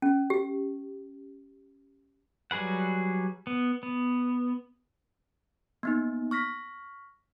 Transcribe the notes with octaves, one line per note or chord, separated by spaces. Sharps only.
C#4
G4
F#3 G3 G#4 B4 F#5
B3
B3
A#3 B3 D#4
C#6 F6 A#6 B6